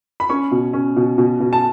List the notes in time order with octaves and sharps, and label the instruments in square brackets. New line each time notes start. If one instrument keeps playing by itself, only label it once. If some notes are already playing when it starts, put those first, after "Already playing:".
[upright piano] B5
C#4 C#6
B2
C#4
B2
B2
B2
A5